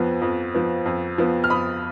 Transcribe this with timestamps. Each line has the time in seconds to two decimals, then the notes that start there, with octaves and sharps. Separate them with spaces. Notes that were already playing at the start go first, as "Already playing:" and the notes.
Already playing: F2 F3 B3
0.22 F2
0.54 F3 B3
0.86 F2
1.18 F3 B3
1.44 F6
1.50 F2 B5 D#6